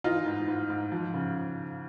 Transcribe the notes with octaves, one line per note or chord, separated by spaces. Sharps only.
E3 D#4 F4
G#2
G#2
G#2
F3
C#3